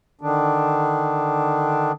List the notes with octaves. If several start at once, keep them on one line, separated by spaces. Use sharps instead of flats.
D3 D#3 D4